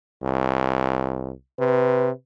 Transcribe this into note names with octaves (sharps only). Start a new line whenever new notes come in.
C2
C3 B4